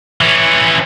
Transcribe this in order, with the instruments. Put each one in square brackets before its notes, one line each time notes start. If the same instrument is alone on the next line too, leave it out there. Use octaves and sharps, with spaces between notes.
[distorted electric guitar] E3 C#4